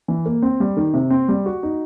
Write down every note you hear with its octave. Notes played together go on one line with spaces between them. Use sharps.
E3
A#3
C4
G3
D#3
C3
C4
G3
F#4
D#4